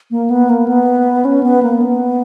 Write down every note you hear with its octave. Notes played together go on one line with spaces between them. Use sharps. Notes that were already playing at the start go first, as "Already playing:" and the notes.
A#3
B3
A#3
B3
C#4
B3
A#3
B3